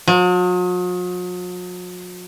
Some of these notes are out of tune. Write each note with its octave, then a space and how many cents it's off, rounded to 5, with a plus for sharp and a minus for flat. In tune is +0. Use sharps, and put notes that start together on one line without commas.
F#3 -45